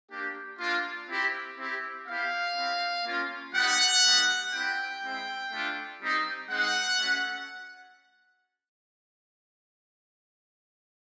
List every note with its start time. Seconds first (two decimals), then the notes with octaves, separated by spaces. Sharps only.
0.09 A#3 D4 G4
0.59 A#3 D4 F4
1.08 C4 E4 G4
1.58 C4 E4 G4
2.07 B3 E4 G4 F5
2.56 C4 E4 G4
3.05 A#3 C#4 F4
3.55 G3 B3 D#4 F#5
4.04 G3 A#3 D#4
4.53 C4 E4 G4 G5
5.02 G#3 C4 E4
5.52 A3 D4 F4
6.01 G3 C4 D#4
6.49 G#3 C4 D#4 F#5
6.99 A3 C#4 F#4